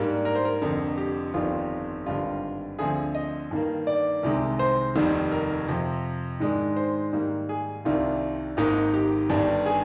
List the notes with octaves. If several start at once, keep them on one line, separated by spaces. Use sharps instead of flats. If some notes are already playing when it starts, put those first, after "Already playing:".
Already playing: G#2 G3 A#3 D4
A#4
C5
A#4
F1 F2 D3
G4
G1 F2 D#3 G3 F4
G#1 G2 D3 G3 F4
D2 D3 F3 C4 G#4
D#5
G2 D#3 A#3
D5
C2 C3 D#3 G#3
C5
F1 D#2 D#3 G3
A#4
F2 C3 F3
G#2 D#3 G#3 D4
C5
G#2 D#3 G3 A#3
G#4
C2 C3 D#3 G3 D4 F4
G#1 G#2 D#3 A#3 D#4
G4
G1 G2 D#3 G3 D4
G#4